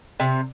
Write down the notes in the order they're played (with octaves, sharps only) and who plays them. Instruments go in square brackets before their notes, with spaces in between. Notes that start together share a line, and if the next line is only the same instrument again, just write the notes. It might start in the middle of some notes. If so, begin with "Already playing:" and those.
[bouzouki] C3